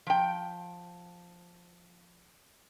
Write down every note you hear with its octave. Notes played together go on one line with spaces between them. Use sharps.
F3 G5